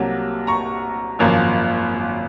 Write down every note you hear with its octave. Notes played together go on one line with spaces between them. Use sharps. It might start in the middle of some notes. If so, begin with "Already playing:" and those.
Already playing: C2 C3 F#3 A#3
A#5 C#6
G#1 F#2 F3 A#3